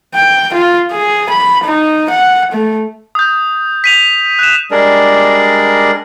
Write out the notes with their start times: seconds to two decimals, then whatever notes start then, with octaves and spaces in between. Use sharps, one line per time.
0.15 G5
0.54 F4
0.92 G#4
1.29 B5
1.64 D#4
2.10 F#5
2.52 A3
3.15 D#6 G6
3.84 B6 D#7 F7
4.39 F#6 E7
4.71 G3 G#3 D4 G#4 A#4 D5